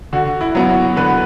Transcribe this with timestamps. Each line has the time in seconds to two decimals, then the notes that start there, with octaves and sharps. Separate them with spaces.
0.13 D3 F#4
0.41 E4
0.55 F#3 B3 E4
0.69 F#4
0.97 D3 B4